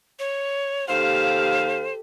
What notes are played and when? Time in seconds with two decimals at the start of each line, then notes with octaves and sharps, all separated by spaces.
0.19 C#5
0.88 D#2 G4 A4 C5 F5